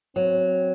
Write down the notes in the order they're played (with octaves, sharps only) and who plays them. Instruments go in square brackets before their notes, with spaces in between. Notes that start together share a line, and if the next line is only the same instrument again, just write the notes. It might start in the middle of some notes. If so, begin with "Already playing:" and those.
[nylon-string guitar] F#3 [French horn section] C4